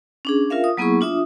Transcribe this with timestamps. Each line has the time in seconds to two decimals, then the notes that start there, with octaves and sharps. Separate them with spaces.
0.25 C#4 D4 G#4
0.50 F4 A#4 E5 F5
0.64 D#6
0.77 F#3 A#3 B3 E4 G#4 C#6
1.01 D4 F4 E5 D#6